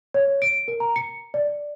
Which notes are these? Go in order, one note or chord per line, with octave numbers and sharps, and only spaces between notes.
C#5
D7
A#4
A#5
C#7
D5